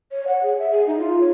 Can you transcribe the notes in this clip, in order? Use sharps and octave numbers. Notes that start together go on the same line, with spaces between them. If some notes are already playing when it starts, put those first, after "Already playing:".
C#5
F#5
G#4
E5
G#4
D#4
F4
C#5